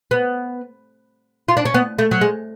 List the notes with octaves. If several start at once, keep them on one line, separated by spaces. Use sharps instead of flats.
B3
F4
D4
C#4
B3
A3
F#3
G#3